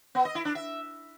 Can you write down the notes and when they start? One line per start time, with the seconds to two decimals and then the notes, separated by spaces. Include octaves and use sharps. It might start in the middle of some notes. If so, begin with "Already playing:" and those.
0.15 B3
0.25 D#5
0.35 E4
0.45 D4
0.55 E5